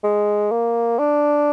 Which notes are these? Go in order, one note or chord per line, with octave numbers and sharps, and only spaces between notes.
G#3
A#3
D4